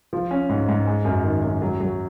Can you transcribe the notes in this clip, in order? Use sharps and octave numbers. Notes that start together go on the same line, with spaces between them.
F3
C#4
G#2
G#2
G#3
F#2
D#3
F#2
F#3
F#3